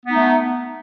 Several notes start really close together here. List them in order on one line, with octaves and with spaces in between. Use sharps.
B3 D#4 A3